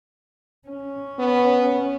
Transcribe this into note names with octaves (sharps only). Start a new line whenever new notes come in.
C#4
B3